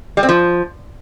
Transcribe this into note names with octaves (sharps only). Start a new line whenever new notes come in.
G3
C4
F3